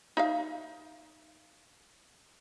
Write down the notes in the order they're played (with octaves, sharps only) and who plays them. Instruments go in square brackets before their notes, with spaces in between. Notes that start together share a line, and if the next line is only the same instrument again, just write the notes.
[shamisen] D#4 E5 F5